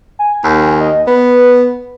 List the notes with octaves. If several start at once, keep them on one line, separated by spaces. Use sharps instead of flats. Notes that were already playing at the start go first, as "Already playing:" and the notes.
G#5
D#2
D#5
B3 B4